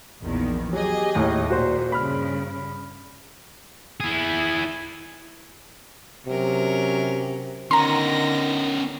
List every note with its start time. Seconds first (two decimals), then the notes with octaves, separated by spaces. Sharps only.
0.21 A#1 E2 D#3
0.73 F#3 G4 G#4 D#5
1.15 D#2 A2
1.50 A#2 F#4 C5
1.92 G2 C#3 B5 F6
4.00 E4 G#4
6.27 C3 F#3 C#4 A#4
7.71 D3 D#3 B3 C#4 A#5 C6 A#6